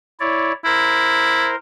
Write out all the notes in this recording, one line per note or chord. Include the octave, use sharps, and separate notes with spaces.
E4 C#5 D5
E4 A#4 C5